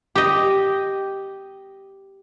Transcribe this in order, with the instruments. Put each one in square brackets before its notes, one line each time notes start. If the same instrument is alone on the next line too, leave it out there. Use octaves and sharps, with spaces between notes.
[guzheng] G4 D#5